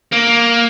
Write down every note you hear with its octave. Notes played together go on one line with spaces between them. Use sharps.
A#3